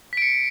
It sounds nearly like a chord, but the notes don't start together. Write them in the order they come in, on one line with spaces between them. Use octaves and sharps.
B6 D7 C#7